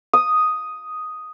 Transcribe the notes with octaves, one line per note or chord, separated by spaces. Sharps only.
D#6